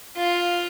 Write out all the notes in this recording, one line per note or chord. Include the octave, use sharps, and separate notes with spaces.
F4